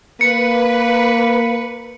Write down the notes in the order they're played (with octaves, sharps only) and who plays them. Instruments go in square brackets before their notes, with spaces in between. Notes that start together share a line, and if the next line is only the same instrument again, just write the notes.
[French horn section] A#3 [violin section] B4 [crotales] C#7